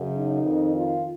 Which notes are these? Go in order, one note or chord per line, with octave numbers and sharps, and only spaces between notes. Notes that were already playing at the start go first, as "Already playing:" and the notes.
Already playing: F#2 C#3
D#4
F2 D#3
F4